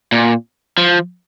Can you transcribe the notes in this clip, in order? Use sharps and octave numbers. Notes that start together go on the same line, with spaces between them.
A#2
F3